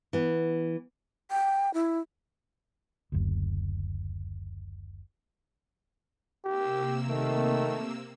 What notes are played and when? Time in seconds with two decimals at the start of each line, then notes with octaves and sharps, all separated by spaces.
0.13 E3 B3
1.31 G5
1.74 E4
3.12 F#1 D2
6.45 C3 A#3 G4 E6
7.09 D#3 A3